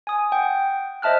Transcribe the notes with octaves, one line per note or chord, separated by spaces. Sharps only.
G#5 D#6
F#5 G5
C5 D#5 E5 A5 F6 F#6